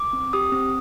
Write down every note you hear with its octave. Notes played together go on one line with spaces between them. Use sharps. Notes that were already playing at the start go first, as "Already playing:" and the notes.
Already playing: D6
C4
G4 D#6
C4